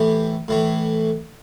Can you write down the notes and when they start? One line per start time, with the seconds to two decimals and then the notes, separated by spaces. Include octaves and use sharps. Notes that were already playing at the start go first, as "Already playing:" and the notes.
Already playing: A2 E3 G4
0.48 A2 E3